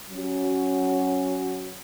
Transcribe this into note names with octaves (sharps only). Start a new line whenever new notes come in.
F#3 C#4 F#4